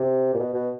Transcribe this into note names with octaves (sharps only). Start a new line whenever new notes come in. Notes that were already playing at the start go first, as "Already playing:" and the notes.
Already playing: C3
A#2
B2
B2